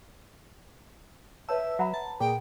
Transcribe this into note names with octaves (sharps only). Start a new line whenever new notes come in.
B4 C#5 E5 A5 E6
F#3 F#5 A#5 B5
A5
A#2 G#4 G5